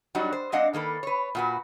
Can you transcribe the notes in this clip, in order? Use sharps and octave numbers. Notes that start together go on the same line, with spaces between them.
F#3 G3 D4 D#4 F#4
C5
G#3 C4 D4 D#5 F5 F#5
D#3 A#3 A4 B4
B4 C#5
A#2 F#4 B4